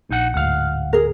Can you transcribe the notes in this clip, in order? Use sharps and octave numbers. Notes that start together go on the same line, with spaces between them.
A#1 D#4 F#5
D1 D2 G#2 F5 F#5
G#4 A#4